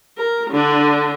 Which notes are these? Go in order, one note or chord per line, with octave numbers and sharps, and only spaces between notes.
A#4
D3 D4